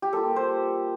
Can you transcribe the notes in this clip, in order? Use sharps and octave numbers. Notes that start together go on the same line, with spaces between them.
G4
G3 A#3 F4 A4
C5